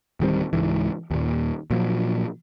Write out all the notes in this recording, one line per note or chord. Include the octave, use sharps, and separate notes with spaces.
D1 D#3 G3 C4
C#2 G#2 E3
D#2 A#2
A#2 F3 F#3